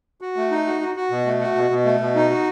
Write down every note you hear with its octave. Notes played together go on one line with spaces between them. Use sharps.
F#4
A3
D#4
F#4
F#4
F#4
B2
A3
F#4
B2
B2
A3
B2
D#4
F#4